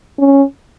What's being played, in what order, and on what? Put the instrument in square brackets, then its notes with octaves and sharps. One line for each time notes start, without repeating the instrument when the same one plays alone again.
[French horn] C#4